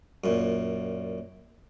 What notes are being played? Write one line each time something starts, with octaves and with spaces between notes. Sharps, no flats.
F#2 A#2